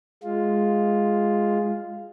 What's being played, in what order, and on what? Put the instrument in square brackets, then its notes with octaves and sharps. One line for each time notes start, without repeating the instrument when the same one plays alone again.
[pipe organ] G#3 F4